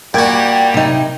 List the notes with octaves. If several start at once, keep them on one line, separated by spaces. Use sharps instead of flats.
A#2 G3 F#4 D5 G5 G#6
C3 D#4